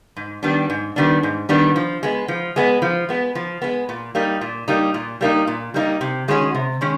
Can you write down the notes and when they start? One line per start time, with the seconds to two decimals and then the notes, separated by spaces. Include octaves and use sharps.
0.16 G#2
0.43 D#3 G3 B3 D4
0.70 G#2
0.96 D#3 G3 B3 D4
1.23 G#2
1.49 D#3 G3 B3 D4
1.76 F3
2.03 G#3 B3
2.28 F3
2.56 G#3 B3
2.82 F3
3.09 G#3 B3
3.35 F3
3.62 G#3 B3
3.89 A#2
4.15 G3 A#3 D#4
4.41 A#2
4.68 G3 A#3 D#4
4.94 A#2
5.21 G3 A#3 D#4
5.47 A#2
5.74 G3 A#3 D#4
6.01 C3
6.28 D#3 G#3 C#4 F#4
6.55 C3
6.81 D#3 G#3 C#4